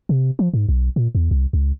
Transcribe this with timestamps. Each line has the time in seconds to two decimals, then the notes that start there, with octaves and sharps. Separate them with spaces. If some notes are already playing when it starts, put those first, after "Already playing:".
0.09 C3
0.39 F3
0.54 G#2
0.69 B1
0.96 A#2
1.15 E2
1.31 C2
1.53 C#2